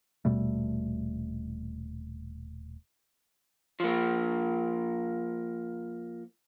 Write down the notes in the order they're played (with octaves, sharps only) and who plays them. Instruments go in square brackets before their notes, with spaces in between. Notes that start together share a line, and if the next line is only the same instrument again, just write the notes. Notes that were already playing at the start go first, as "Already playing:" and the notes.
[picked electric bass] D#1 B2 G3 A3
[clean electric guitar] F3 A#3